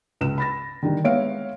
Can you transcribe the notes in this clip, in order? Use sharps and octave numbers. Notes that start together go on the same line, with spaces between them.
C#2 E7
B5 A6 A#6
D3 D#3 G3
G#3 B3 C#5 E5 F5 D7